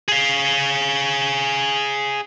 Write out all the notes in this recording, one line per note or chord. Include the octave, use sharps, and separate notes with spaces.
G#4 F5